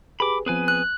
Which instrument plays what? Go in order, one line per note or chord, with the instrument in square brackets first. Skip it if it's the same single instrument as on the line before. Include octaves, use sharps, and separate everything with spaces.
[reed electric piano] G4 G#4 B4 [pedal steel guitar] B5 D6
[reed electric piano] F3 B3 C4 [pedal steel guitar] G#4 B4 G#5
[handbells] F#6